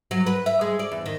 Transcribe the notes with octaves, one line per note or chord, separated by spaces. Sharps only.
F#3
B4
E5
G#3
D5
E2
D#3